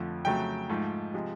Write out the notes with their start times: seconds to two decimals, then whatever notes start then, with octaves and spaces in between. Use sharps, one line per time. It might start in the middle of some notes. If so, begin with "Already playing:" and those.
Already playing: F2 D3 F3 A3
0.25 F2 C#3 F#3 A3 G5
0.69 G#2 F3 A3
1.14 C3 F3 G#3